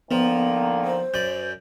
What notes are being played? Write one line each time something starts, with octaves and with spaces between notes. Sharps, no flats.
D3 D#3 F3 A#3 B3
C5
F#2 D5 G6